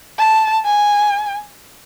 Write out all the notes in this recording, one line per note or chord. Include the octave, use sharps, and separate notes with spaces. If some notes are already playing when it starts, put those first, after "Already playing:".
A5
G#5